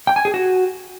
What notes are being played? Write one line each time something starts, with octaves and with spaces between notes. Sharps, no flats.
G5
G#5
G#4
F#4